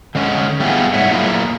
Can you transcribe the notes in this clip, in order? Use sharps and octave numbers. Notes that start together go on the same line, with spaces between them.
D3 G#3 C#4
G3 A3 B3 E4 F4 G#4
G#2 G3 C#5 E5 F#5
F#3 A3 A#3 E4 F4 G#4